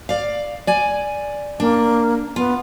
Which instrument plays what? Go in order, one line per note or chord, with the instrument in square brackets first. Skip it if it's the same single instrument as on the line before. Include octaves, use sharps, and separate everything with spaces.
[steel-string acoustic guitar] D5 F5
D5 G#5
[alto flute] A#3 [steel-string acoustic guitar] D4
[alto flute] B3 [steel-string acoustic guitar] F4